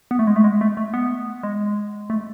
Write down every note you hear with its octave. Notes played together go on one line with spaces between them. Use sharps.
B3
A3
G#3
A3
G#3
A3
A3
B3
G#3
A3